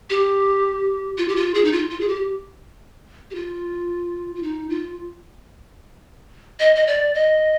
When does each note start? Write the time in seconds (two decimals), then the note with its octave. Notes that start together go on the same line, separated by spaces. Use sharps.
0.10 G4
1.18 F4
1.28 G4
1.36 F4
1.54 G#4
1.64 D#4
1.72 F4
1.90 F4
2.01 G#4
2.08 G4
3.31 G4
3.35 F4
4.35 F4
4.43 D#4
4.70 F4
6.60 D#5
6.75 D#5
6.87 D5
7.15 D#5